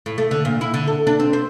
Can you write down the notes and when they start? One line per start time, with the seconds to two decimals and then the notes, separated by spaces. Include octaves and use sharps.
0.06 A2
0.18 A3
0.31 D3
0.45 A#2
0.61 E4
0.74 D3
0.87 A4
1.07 D4
1.20 C4
1.33 C5